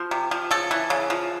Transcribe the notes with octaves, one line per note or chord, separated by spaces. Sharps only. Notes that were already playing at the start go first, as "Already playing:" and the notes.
Already playing: F3 C5
C3
F3
C#3 A4
E3
C#3
F3